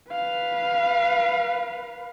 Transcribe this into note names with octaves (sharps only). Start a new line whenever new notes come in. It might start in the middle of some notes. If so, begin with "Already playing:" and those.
B4 F5